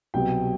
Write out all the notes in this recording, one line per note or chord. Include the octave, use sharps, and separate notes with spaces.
C2 B2 F#3 B3 G5